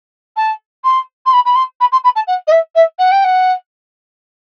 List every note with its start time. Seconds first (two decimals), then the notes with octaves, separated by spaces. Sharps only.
0.36 A5
0.84 C6
1.26 C6
1.33 B5
1.45 B5
1.55 C6
1.80 B5
1.92 C6
2.04 B5
2.15 A5
2.27 F#5
2.47 D#5
2.51 E5
2.75 E5
2.99 F#5
3.12 G5
3.24 F#5